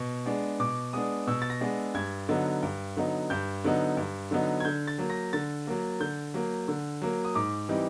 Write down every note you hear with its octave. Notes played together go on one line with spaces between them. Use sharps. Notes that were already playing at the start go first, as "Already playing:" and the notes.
Already playing: B2
G#3 B3 D4
B2 D6
G#3 B3 D4 D#6
B2 E6
A6
A#6
G#3 B3 D4
G2 G#6
D3 F#3 B3 D#4
G2
D3 F#3 B3 D#4
G2 G6
D3 F#3 B3 D#4
G2
D3 F#3 B3 D#4
G#6
D3 G6
A6
F#3 A#3
A#6
D3 A6
F#3 A#3
D3 G6
F#3 A#3
D3
F#3 A#3
D#6
G#2 D6
E3 G3 C4 D#4